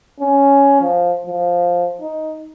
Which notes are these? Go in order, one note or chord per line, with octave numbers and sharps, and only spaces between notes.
C#4
F3
F3
D#4